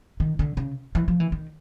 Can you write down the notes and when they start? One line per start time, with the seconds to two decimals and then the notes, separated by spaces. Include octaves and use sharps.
0.20 D#3
0.39 D3
0.57 C#3
0.95 E3
1.08 F3
1.20 E3
1.32 D#3